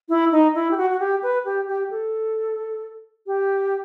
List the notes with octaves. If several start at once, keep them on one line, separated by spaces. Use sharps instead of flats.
E4
D#4
E4
G4
F#4
F#4
G4
B4
G4
G4
A4
G4